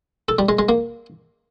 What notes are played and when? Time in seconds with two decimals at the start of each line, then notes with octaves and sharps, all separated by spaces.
0.29 A4
0.39 G3
0.49 G#3
0.59 G#3
0.69 A#3